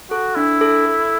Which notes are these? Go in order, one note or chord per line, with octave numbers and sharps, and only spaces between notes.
F#4 A4
D4 E4
A4
A4